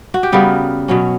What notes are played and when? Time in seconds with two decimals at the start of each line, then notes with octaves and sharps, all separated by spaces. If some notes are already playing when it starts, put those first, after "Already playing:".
0.14 F#4
0.23 G4
0.32 C#3 G3 B3 F#4 A#4
0.88 B2 F#3 C#4